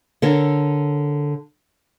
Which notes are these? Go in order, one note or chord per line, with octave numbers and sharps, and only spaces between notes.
D3 A4 A#4 C#5